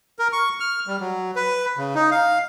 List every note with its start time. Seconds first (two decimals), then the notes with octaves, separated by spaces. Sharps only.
0.19 A#4
0.33 C#6
0.60 F6
0.87 G3
1.00 F#3
1.36 B4
1.77 C#3
1.95 D#4
2.11 F5